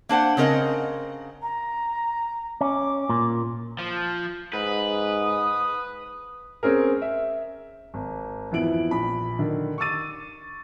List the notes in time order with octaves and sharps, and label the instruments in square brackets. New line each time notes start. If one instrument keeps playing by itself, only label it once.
[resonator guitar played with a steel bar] A#3 D4 C5 F#5
C#3 C4 A#4 D#5 F#5
[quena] A#5
[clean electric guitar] C#4 [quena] D6
[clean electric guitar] A#2
[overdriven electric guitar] F3
[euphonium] G#2 [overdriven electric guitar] B4 [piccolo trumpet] D#6
[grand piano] C4 C#4 G#4 A#4
E5
[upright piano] G#1
F2 E3 B3 E4 D7 F#7
A#1 B5
D3 D#3
C#6 D6 E6 A6 D#7